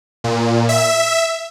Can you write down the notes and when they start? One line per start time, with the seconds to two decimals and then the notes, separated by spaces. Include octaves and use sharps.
0.24 A#2
0.69 E5